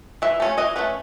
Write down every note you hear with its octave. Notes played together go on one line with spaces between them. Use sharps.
E3 E5
A3 C#4
E3 D#5
A3 C#4 B4